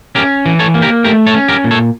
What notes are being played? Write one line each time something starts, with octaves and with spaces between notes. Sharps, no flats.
C#4 G4 A#4
E3
A4 C#5
A#3
G4 A#4
A3 G4 A#4
A4 C#5
C#4
G4 A#4
A#2
A4 C#5